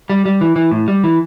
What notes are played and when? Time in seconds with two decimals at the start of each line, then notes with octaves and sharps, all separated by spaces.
0.10 G3
0.26 G3
0.41 E3
0.56 E3
0.71 A2
0.88 G3
1.04 E3